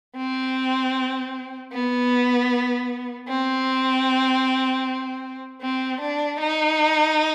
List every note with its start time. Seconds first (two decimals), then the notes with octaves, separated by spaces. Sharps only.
0.16 C4
1.73 B3
3.28 C4
5.62 C4
6.01 D4
6.40 D#4